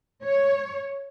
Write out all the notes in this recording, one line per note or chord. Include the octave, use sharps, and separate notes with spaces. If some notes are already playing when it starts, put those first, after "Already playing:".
C#5